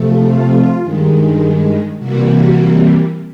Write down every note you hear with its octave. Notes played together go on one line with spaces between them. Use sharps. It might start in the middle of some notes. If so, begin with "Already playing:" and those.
Already playing: C3 F3 A3
F4
G2 D#3 G#3
C3 E3 G3 A#3 F#4